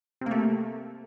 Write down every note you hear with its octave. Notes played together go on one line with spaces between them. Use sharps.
C3 A3 A#3